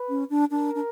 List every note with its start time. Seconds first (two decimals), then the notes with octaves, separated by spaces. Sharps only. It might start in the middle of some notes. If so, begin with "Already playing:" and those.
Already playing: B4
0.09 C#4
0.30 D4
0.51 D4 A#4
0.75 D4